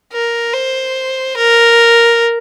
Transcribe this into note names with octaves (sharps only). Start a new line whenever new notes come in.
A#4
C5
A#4